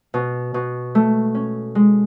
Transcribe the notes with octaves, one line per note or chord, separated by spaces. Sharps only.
B2
B2
A3
C#4
G#3